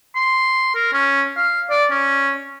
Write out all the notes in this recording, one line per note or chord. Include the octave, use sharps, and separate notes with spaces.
C6
A#4
C#4
F5
D5
C#4